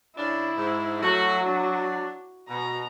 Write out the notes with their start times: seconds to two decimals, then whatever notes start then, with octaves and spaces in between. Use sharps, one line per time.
0.17 C#3 C#4 D4 E4
0.55 G#2
1.02 F#3 A3 F#4
1.45 D4
2.49 B2 A#5